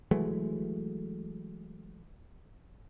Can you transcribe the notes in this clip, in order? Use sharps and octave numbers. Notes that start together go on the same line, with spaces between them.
E3 F#3 G#3 A3